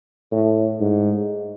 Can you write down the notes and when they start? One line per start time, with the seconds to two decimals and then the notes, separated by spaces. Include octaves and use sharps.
0.32 A2
0.81 G#2